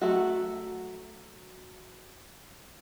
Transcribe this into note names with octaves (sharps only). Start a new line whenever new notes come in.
F#3 A3 F#4